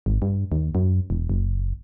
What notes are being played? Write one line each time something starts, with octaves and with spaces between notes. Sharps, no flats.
G#1
G2
D#2
F#2
E1
F#1